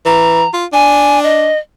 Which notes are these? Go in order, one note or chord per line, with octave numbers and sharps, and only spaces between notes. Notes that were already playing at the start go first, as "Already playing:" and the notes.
E3 A#5
F4
D4 G#5
D#5